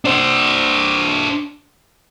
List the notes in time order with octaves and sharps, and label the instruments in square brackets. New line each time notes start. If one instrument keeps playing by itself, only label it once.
[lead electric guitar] D4 C5